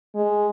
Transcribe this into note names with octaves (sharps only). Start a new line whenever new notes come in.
G#3